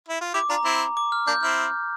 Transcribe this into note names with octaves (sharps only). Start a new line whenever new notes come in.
E4
F4
E4 G4 D6
D4 F4 A#5
C4 E4
D6
F6
A#3 D4 G6
C4 E4 F6